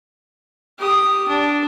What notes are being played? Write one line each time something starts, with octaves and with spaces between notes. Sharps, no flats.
G4 D#6
D4